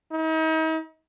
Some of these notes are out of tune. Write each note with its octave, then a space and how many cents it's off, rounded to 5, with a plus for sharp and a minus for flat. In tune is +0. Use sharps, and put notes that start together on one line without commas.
D#4 +40